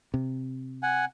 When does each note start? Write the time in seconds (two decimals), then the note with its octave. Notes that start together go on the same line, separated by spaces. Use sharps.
0.14 C3
0.83 F#5 G#5